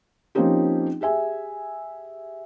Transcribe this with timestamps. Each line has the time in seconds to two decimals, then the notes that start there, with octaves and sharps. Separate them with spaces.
0.35 F3 A#3 C4 C#4 D#4 G4
1.01 G4 G#4 E5 G#5